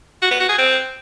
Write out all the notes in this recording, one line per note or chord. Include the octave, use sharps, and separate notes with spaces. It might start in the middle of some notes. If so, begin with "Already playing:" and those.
F#4
B3
F#4
G#4
C4